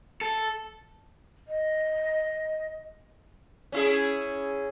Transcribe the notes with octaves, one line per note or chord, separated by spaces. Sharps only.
A4
D#5
C#4 E4 G#4